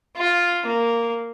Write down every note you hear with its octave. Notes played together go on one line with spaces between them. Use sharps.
F4
A#3